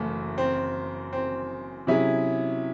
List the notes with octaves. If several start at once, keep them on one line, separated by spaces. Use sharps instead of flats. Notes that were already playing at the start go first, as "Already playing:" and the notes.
Already playing: F#1 F#2 E3 A3
C4
C4
C3 F#3 C#4 E4 G#4